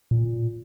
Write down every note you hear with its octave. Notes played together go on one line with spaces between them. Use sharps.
A#2